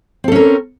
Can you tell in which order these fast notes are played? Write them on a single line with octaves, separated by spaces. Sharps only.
C4 A4 C#4 A#4